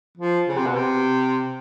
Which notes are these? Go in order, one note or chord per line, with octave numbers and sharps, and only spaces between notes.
F3
C#3
C3
B2
C3